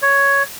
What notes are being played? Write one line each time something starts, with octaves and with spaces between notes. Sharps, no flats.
C#5